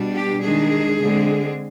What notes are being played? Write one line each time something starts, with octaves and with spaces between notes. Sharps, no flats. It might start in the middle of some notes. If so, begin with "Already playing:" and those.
Already playing: B2 G3 D4
G4
D#3 G#3 D4 G#4
D3 G#3 C4